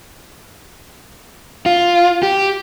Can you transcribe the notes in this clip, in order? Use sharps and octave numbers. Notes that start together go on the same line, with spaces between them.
F4
G4